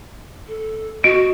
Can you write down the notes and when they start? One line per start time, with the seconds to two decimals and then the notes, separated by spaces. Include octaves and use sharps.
0.48 A4
1.04 F#4 D#5 D7